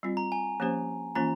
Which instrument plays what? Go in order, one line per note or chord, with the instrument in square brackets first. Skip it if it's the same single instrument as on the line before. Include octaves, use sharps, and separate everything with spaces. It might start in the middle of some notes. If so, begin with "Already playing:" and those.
[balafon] G3 C4 F4
[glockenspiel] A#5
G#5
[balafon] F3 A#3 C#4 G4 C5
[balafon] E3 A#3 C#4 F4 [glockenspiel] A#5